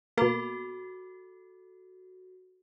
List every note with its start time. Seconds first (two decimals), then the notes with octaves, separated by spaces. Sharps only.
0.17 B2 A#3 F#4 A4